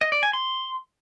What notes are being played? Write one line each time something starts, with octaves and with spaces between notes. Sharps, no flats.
D#5
D5
G#5
C6